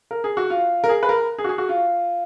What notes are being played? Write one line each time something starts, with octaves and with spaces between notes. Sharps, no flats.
A#4
G#4
F#4
F4
A#4
G#4
B4
A#4
G#4
F#4
G#4
F#4
F4